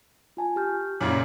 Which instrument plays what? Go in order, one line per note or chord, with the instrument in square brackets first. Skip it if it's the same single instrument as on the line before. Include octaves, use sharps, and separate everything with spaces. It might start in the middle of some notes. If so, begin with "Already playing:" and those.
[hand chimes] F4 G#5 A5
G4 F6 G6
[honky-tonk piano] F#2 A#2 C#3 [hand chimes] D6 A6